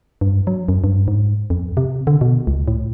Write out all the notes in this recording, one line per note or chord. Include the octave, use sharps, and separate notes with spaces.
G2
F#3
F#2
G2
G#2
F2
C3
D3
B2
C#2
A2